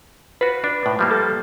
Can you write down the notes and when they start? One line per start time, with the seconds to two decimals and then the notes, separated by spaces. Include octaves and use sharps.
0.41 F4 F#4 B4
0.64 D4
0.86 A2
0.99 F3 G3 A#3
1.11 A4